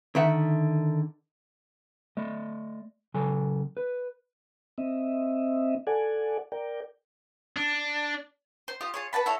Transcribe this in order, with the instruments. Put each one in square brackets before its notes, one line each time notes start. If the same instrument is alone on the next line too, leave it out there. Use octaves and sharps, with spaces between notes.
[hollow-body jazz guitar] D3 D#3 E5 F#5
[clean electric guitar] A3 D5 D#5
C#3 F#3 A4 G#5
B4
[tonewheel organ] C4 D#5 E5
A4 D5 F#5 G#5
A#4 D5 G5
[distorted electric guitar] D4
[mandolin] C5
F4 G4 D#6 F6
F4 G#4 C#5
B4 F#5 A5 B5
E4 F#4 A4 C#5